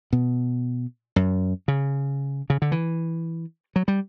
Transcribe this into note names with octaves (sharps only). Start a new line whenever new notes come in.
B2
F#2
C#3
C#3
D3
E3
F#3
G3